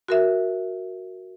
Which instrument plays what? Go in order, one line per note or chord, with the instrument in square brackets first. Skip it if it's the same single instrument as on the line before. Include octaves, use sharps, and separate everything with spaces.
[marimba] F#4 A#4 E5